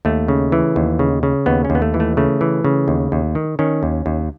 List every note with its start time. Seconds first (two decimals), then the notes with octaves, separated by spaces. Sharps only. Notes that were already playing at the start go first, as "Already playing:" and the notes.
0.05 D#2 A3
0.28 C#3
0.52 E3
0.76 D#2
0.99 C#3
1.23 C#3
1.46 D#2 B3
1.65 C#4
1.70 D#2
1.75 B3
1.82 A3
1.94 E3
2.00 A3
2.17 C#3 A3
2.41 E3
2.65 C#3
2.88 D#2
3.12 D#2
3.35 D#3
3.59 D#3 C#4
3.83 D#2
4.06 D#2